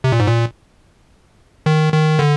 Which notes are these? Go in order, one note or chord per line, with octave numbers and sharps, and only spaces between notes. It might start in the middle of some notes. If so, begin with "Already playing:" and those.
C3
A#2
G#2
A#2
D#3
D#3
D3